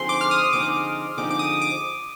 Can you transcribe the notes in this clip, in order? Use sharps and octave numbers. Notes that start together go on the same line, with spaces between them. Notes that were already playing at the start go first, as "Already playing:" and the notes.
Already playing: D3 F3 C4 D#4 G#4 C6
D6
F6
D#6
D3 F3 C4 D#4 G#4 D6
D3 F3 C4 D#4 G#4 D6
D6
D#6
D6